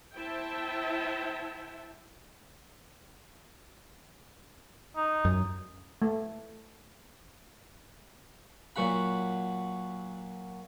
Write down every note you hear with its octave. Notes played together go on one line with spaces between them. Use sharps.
E4 C5 E5 G5 A5
D#4
F#2
A3
A#2 F#3 F#4 F#5 B5